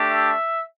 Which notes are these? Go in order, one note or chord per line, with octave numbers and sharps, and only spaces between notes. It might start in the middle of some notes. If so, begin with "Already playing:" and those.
Already playing: A3 D4 G4
E5